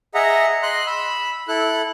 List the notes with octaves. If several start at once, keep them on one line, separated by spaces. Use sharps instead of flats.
G#4 D#5 E5 F#5 A#5
D#5 C6 F#6
B5 E6
E4 A4 F#6